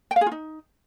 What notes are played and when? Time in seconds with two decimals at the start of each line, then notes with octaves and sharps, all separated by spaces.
0.11 G5
0.16 F5
0.21 G#4
0.26 F4
0.32 D#4